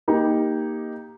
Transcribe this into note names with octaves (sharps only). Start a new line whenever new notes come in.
A#3 D#4 G4